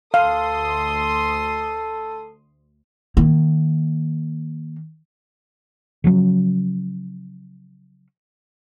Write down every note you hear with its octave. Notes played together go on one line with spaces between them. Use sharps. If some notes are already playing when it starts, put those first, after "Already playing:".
D2 A4 F5 C6 D#6
D#3 A#3
C#3 F3 F#3 C#4